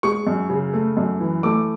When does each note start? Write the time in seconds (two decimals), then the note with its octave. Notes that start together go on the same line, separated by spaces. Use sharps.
0.03 G#3 C#6
0.27 F#2
0.50 C#3
0.74 A3
0.97 F#2
1.20 E3
1.43 A3 D6